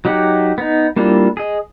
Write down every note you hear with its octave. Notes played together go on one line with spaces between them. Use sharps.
F#3 D#4 G4 F#5
B3 D#4
G3 A#3 D4 E4 F4
G#4 D#5